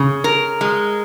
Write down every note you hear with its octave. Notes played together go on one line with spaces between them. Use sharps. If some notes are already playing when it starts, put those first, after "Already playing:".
Already playing: C#3
A#4
G#3